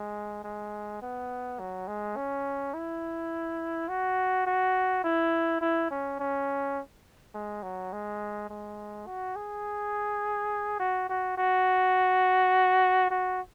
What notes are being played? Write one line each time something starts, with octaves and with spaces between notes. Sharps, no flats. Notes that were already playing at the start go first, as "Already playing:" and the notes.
Already playing: G#3
G#3
B3
F#3
G#3
C#4
E4
F#4
F#4
E4
E4
C#4
C#4
G#3
F#3
G#3
G#3
F#4
G#4
F#4
F#4
F#4
F#4